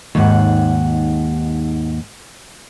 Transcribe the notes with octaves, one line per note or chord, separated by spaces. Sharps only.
D#2 G#2 F#5